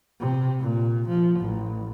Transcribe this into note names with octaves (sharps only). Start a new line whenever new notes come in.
C3
A#2
F3
A1